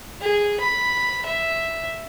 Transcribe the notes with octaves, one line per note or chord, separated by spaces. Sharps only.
G#4
B5
E5